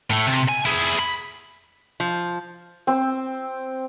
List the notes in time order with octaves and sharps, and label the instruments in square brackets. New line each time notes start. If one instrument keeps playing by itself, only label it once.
[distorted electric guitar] A2 A3
C3
G#5
E4 G#4
B5
[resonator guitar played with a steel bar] F3
[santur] C4